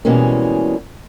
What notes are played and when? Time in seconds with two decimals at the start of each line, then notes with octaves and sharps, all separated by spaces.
0.05 B2 E3 G3 G#3 A#3 C#4